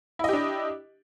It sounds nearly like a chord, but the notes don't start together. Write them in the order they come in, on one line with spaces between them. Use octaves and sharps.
E4 D#5 G4 D4